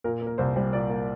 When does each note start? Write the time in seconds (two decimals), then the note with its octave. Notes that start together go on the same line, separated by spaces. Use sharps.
0.04 A#2 A#4
0.21 A#3
0.27 A#4
0.38 C2 C5
0.56 G3 C5
0.72 A#2 D5
0.89 A#3